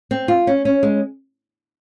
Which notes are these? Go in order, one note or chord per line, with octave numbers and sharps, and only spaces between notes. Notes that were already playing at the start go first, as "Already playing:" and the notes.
C4
F4
C#4
C#4
G#3